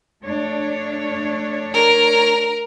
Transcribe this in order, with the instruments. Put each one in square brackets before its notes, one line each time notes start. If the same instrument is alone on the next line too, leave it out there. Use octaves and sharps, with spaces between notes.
[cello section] A3 D4 C#5
[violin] A#4